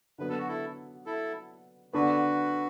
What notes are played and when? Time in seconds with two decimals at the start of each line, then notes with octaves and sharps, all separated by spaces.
0.18 D3 F#3 B3 B4
0.29 A4
0.38 F#4
0.48 E4 A4
1.06 E4 A4
1.93 D3 B3 D4 F#4 B4